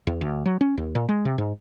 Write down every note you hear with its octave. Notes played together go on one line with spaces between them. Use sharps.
E2
D2
F#3
C#4
D#2
A#2
G#3
C3
G#2